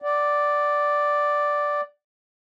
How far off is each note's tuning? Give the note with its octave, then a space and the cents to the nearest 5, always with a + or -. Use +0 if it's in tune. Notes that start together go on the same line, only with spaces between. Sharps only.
D5 +0 F#5 +20